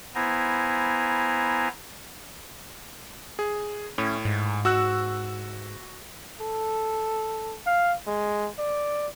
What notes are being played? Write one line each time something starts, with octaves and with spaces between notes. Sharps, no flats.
B3 E4 C5 G#5 A#5
G#4
A2 C#4
G#2
F#4 E6 F#6
A4
F5
G#3
D5